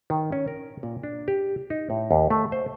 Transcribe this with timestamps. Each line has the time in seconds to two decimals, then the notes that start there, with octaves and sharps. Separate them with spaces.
0.10 D#3
0.32 C#4
0.48 A#4
0.83 A#2
1.03 D4
1.28 G4
1.70 D#4
1.90 A2
2.11 D#2
2.30 A3
2.52 C5